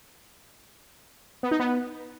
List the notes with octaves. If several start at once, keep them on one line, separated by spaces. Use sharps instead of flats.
B3
D#4
B3